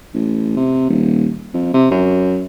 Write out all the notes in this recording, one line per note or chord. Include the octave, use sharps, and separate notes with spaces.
A1
C3
D#1
F2
C3
F#2